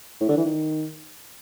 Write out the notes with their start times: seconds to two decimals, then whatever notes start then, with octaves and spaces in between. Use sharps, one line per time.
0.21 A2
0.29 D3
0.37 E3
0.45 D#3